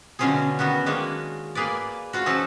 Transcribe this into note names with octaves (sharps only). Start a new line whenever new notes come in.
B2 D3 F#3 C#4 F4 G#4
D#3 B3 C#4 F#4
D#3 G#3 A#3 C#4 D4
A#3 G#4 B4 D5
F4 F#4
F3 C#4 D#4 A4